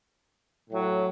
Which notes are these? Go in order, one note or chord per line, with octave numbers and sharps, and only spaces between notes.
A2 F#3